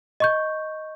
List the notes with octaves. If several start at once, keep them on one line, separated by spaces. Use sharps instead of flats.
D#5 C#6 G6